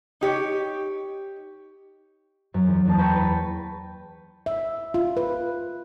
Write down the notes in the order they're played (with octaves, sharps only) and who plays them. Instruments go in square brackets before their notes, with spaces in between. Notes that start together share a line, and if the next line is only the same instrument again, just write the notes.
[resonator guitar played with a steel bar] D#4 G4 C#5
[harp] F#2
E2
E2 A#3 A5
B4 G5 A5 A#5 C#6
B4
[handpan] E5
F4
B4